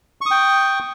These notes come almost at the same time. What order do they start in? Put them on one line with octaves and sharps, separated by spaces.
C#6 D#6 G5